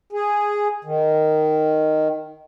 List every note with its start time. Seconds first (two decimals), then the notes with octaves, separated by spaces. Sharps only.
0.12 G#4
0.84 D#3